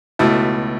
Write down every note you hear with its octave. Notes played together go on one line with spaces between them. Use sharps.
C#2 B2 A3 E4